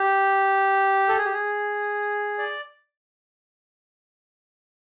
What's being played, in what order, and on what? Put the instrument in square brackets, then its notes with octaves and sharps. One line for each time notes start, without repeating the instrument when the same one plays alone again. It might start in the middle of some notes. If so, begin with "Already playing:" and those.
Already playing: [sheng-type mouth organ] G4
A4
G#4
G4
G#4
D5